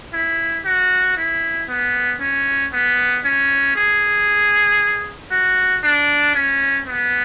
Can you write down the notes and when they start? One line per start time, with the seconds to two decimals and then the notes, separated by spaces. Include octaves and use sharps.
0.13 E4
0.65 F#4
1.17 E4
1.69 B3
2.20 C#4
2.72 B3
3.25 C#4
3.76 G#4
5.31 F#4
5.84 D4
6.35 C#4
6.87 B3